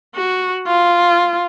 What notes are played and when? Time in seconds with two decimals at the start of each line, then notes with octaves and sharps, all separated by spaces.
0.16 F#4
0.67 F4